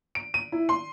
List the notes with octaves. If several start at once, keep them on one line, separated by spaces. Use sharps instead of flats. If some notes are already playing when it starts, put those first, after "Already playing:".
D7
D#7
E4
C6